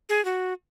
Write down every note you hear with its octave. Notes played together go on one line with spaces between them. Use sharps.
G#4
F#4